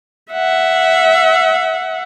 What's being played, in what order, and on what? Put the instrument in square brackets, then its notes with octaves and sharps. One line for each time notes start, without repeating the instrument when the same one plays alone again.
[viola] E5 F#5